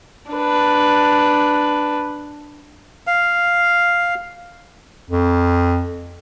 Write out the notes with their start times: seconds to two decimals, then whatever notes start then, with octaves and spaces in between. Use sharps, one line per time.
0.31 D4 B4
3.07 F5
5.11 F2